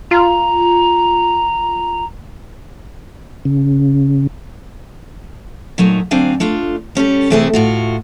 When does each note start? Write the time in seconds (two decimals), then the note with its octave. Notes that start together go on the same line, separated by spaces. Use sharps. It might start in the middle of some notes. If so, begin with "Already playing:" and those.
0.11 F4 A#5
3.45 C#3
5.78 A#2 F#3 A3 D#4
6.11 D2 F#3 C4 D4 F5 G#5
6.40 A3 D4 F4
6.95 G3 C#4 G4 A4
7.30 C3 E3 A3 C4 F4 G#4
7.53 A2 F4 F#4